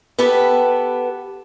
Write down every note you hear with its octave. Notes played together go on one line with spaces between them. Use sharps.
B3 G4 A4 B4